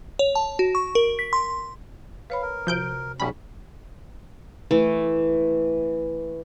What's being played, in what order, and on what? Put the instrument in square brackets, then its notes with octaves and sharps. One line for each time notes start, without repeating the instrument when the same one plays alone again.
[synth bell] C#5
A5
F#4
C#6
A#4
B6
C6
[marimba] B4 C#5 B5 [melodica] F5
[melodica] A#4
[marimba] C3 F#4 [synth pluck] F3 G6 D7
[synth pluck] B1 B5 [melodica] F#3 G3 C#4
[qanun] E3 A3